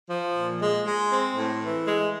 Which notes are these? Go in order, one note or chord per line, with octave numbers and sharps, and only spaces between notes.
F3
A#2
G#3
G#3
C4
A2
E3
G#3